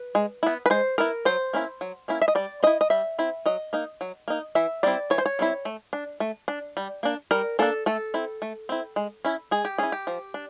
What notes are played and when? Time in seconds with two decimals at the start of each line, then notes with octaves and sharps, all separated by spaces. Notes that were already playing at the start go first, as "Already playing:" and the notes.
Already playing: B4
0.15 G#3
0.43 B3 E4
0.66 B4
0.70 G#3 C5
0.98 B3 E4 A#4
1.25 F#3 C5
1.53 A#3 C#4 E4
1.81 F#3
2.08 A#3 C#4 E4
2.22 E5
2.28 D#5
2.35 G3 D5
2.63 C4 E4 D#5
2.81 D#5
2.90 G3 E5
3.19 C4 E4
3.46 F#3 D#5
3.73 A#3 D#4
4.01 F#3
4.28 A#3 D#4
4.55 E3 E5
4.83 G3 C4 E4 D5
5.10 E3 C#5
5.18 C5
5.26 C#5
5.39 G3 C4 E4
5.65 A3
5.93 D4
6.20 A3
6.48 D4
6.77 G3
7.03 A#3 D4
7.31 G3 A#4
7.59 A#3 D4 A4
7.86 A3 A4
8.14 C4 E4
8.42 A3
8.69 C4 E4
8.96 G#3
9.25 C#4 E4
9.51 G#3 G#4
9.65 G4
9.78 C#4 E4 G#4
9.92 G4
10.07 F3
10.34 D4